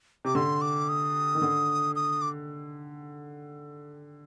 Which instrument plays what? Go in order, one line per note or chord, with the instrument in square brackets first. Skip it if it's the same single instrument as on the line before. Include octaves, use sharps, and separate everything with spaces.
[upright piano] C3 [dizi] D6
[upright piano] D3 [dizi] C6
[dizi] D6
D#6
[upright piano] D#3
D3
[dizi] D#6
D6